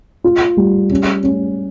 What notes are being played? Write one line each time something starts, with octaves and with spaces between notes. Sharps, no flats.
F4
G3
C#4
C#4